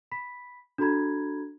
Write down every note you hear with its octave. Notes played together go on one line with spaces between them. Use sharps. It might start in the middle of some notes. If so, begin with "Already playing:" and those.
B5 B6
D4 F#4 A4 A#5 B5 G#6